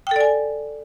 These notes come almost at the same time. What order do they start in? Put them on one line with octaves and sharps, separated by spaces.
G5 A4 D5 G#5